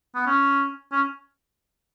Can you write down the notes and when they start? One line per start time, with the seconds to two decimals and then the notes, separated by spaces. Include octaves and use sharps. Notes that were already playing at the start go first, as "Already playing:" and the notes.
0.15 B3
0.27 C#4
0.92 C#4